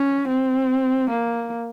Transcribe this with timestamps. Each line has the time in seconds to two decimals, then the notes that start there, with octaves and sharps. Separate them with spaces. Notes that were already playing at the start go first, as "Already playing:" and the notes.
Already playing: C#4
0.28 C4
1.11 A#3